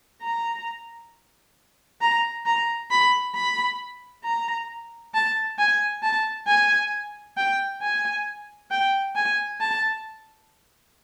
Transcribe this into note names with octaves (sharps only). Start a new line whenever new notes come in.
A#5
A#5
A#5
B5
B5
A#5
A5
G#5
A5
G#5
G5
G#5
G5
G#5
A5